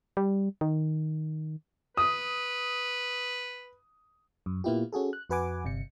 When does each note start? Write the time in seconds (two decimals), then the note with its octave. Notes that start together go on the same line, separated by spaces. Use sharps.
0.17 G3
0.61 D#3
1.97 B4 D#6
4.46 F#2
4.64 A#2 A#3 B3 E4 F4 G4
4.92 C#4 F#4 G#4 A4
5.13 F#6
5.29 F2 F#4 B4 F#5 G#5 D6
5.64 G1 C3 C#7